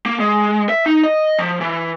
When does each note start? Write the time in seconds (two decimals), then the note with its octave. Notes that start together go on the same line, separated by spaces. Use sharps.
0.06 A#3
0.20 G#3
0.69 E5
0.86 D#4
1.03 D#5
1.39 F3
1.61 E3